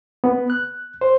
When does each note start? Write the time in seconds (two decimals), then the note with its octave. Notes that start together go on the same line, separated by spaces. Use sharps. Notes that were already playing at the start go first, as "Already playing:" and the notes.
0.24 B3
0.50 F#6
1.01 C5